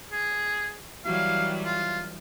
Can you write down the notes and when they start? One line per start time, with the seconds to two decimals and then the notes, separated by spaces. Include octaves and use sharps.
0.11 G#4
1.05 E3 F#3 G3 F5
1.65 F4